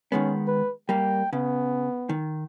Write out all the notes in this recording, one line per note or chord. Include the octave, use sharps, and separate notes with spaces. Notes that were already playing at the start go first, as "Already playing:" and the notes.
D#3 G#3 B3 C#4
B4
G3 A#3 G5
C#3 B3
D#3